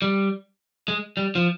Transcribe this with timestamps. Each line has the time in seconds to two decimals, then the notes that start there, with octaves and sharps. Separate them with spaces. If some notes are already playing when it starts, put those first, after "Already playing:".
0.02 G3
0.88 G#3
1.17 G3
1.35 F3